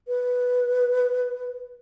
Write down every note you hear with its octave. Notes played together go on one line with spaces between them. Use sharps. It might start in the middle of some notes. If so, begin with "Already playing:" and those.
B4